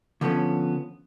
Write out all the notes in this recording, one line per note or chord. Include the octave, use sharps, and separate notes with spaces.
D3 F3 A3 B3 C#4